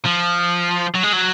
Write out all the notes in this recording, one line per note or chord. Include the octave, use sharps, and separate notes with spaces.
F3
F#3
G#3
F#3